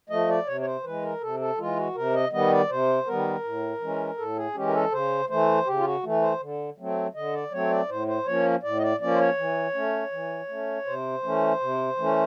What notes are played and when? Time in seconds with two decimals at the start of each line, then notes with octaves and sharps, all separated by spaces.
0.10 F3 A3 D#5
0.28 D5
0.47 C3 C#5
0.61 C#5
0.66 C5
0.84 E3 G#3 B4
1.03 A#4
1.21 C3 A4
1.39 A4
1.58 E3 G#3 F4
1.77 F#4
1.95 C3 A#4
2.13 D#5
2.32 D#3 G3 B3 D#5
2.51 D5
2.70 C3 C5
3.06 D#3 G3 B3 A#4
3.44 A2
3.81 E3 G#3 C#4
4.17 A2 A4
4.36 G#4
4.55 E3 G#3 C#4 G4
4.68 A#4
4.74 A4
4.91 C#3 C5
5.29 E3 A3 C5
5.66 C#3 G4
5.79 F4
5.85 F#4
6.03 E3 A3
6.22 C5
6.40 D3
6.78 F#3 A3 C4
7.14 D3 D#5
7.33 D5
7.52 F#3 A3 C4 C#5
7.70 D5
7.89 A2 C5
8.07 C5
8.26 F3 A#3 C#4 C#5
8.63 A2 D5
8.77 D#5
8.82 D5
9.00 F3 A#3 C#4 D5
9.13 C5
9.19 C#5
9.38 E3
9.74 A3 C#4
10.12 E3
10.48 A3 C#4
10.85 C3 C5
11.23 E3 A3 C#4
11.60 C3
11.97 E3 A3 C#4